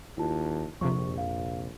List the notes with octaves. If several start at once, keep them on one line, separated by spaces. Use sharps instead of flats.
D#2 E4 F4 A5
A#1 F2 C3 C#6
F5